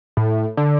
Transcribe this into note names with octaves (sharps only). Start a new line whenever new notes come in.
A2
D3